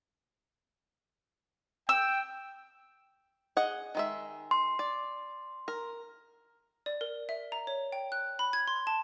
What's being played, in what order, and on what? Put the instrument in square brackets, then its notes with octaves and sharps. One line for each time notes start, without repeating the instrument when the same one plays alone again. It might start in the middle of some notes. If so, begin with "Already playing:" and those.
[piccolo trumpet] G5 [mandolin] E6
[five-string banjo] G#4 D#5 F#5
D#3 G#3 E5
[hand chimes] C6
[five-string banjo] D5
A#4
[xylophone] D5
A#4
E5
A#5
C#5
G5
F#6
B5
G#6
C6
A5